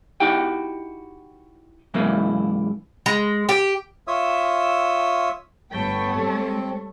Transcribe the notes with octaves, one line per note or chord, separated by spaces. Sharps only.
D#4 E4 F#4 G4 G5
G#2 C#3 E3 F#3 A#3 E4
G#3
G4
F4 C#5 E5 D#6 E6
G1 A3 B3 C#5 G5
G3 C4 A4